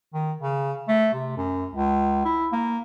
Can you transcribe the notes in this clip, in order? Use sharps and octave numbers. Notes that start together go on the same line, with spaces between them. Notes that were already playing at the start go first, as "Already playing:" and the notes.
D#3
C#3
A3
C3
F#2
C#2
E4
A#3